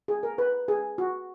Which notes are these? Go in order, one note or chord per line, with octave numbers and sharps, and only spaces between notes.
G#4
A#4
B4
G#4
F#4